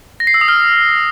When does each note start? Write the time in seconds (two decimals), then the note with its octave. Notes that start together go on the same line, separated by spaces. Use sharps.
0.20 A#6
0.27 C7
0.34 E6
0.41 D#6
0.48 F6